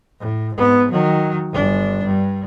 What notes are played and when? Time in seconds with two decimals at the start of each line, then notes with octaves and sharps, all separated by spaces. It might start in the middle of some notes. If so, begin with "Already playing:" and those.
0.20 A2
0.55 G#2 B3
0.92 D#3 F#3
1.53 G1 D4
2.05 G2